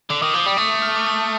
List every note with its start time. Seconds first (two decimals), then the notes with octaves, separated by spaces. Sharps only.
0.10 D3 D6
0.22 D#3 D#6
0.34 F3 D6
0.46 G3 D#6
0.57 A3 D#6
0.82 F6
0.95 D6
1.06 D#6